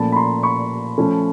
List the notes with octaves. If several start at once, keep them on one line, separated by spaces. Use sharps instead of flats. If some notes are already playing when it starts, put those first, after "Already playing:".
Already playing: A#2 F3 A3 C#4 A5 B5
B5
A#5 C6
B5 C#6
F3 A3 C#4